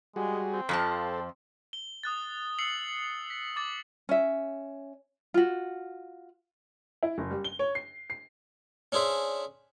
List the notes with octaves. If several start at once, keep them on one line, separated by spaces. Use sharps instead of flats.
G3 G#3 F#4 G#4
C4
F2 F3 A4 A5
G7
D#6 F#6 A6
E6 C7 C#7 F#7
B6
D6 A6 F#7
C#4 E5
F4 F#4
E4
F#1
G3
G7
C#5
C7
C7
C#4 D4 G#4 C5 E5